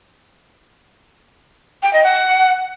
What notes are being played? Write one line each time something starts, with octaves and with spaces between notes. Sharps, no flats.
G5
D#5
F#5